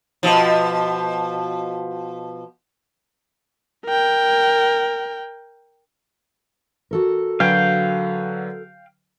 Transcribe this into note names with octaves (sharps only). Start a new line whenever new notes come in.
B2 F3
A#4 G5
F#4 A4 A#4
D3 F#3 B4 F5 G5